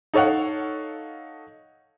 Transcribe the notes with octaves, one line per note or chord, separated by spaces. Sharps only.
D#4 A4 C#5 F5 F#5